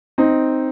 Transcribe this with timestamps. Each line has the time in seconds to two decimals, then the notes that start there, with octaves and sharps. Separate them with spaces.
0.18 C4 D#4